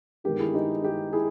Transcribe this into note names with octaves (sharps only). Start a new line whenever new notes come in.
G2 D#3 G#3 B3 G4 A#4
E4 G#4
D#4 G4
D#4 G4
E4 G#4